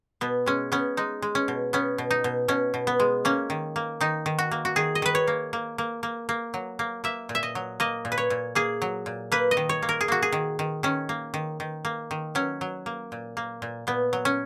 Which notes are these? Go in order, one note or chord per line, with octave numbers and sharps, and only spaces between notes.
B2 B3
G#3 C#4
B3 C#4
G#3 D#4
G#3
C#4
B2
B3 C#4
B2
D#4
B2
B2 C#4
B2
B3
G#3
A#3 C#4
D#3
A#3
D#3 D#4
D#3
F#4
A#3
F#4
D#3 G#4
D#5
D#3 B4
C#5
A#3
A#3
A#3
A#3
A#3
F#3
A#3
A#3 E5
A#2
E5
D#5
F#3
A#3 D#5
A#2
B4
C#5
A#2
A#3 G#4
F#3
A#2
A#3 B4
D#5
D#3
C#5
A#3
A#4
G#4
A#3 F#4
G#4
D#3
D#3
D#3 C#4
A#3
D#3
D#3
A#3
D#3
F#3 C#4
F#3
A#3
A#2
A#3
A#2
A#2 B3
F#3
C#4